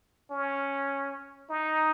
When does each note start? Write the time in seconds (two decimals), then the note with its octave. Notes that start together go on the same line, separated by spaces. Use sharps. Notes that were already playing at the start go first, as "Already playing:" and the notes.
0.31 C#4
1.50 D#4